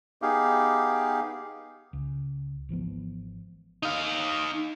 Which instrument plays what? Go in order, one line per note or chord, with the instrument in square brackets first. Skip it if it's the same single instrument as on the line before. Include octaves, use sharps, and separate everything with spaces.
[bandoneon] B3 D#4 G4 G#4 F5
[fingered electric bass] C#2
G#1 E3 F3 B3
[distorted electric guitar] D#4 F5